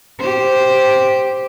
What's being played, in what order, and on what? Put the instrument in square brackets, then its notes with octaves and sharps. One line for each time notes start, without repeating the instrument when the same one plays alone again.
[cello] G4 C5